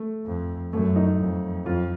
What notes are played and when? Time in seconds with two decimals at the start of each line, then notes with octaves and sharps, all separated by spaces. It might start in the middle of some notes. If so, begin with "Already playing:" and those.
Already playing: A3
0.26 F2
0.73 F#2 A3
0.96 D#4
1.19 F2
1.66 F2 F4